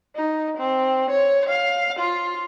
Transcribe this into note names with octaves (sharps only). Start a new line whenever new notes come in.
D#4
C4
C#5
F5
F4